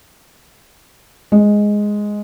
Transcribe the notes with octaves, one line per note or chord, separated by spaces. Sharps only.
G#3